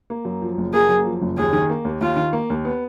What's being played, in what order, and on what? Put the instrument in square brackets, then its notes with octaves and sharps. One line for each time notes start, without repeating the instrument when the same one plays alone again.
[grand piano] A#3
F#2
F3
F#1
[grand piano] A#3 [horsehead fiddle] G#4
[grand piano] F#2
F3
F#1
[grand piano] D#2 [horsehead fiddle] G#4
[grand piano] D#3
A#3
D#2
[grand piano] D#2 [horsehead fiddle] F4
[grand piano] D#3
A#3
D#2
B3